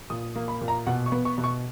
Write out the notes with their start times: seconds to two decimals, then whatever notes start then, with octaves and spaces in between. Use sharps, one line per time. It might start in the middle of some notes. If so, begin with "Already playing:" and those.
0.10 A#2 D#6
0.36 A#3
0.48 B5
0.61 A#2
0.68 A#5
0.87 B2 F#5
1.06 C#6
1.12 B3
1.25 C#6
1.38 B2
1.44 C#6